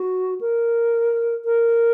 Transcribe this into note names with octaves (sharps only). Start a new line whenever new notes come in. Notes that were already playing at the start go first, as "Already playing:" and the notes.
Already playing: F#4
A#4
A#4